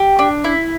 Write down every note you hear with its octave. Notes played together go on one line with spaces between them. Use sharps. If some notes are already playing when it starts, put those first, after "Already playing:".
Already playing: G4
D4
E4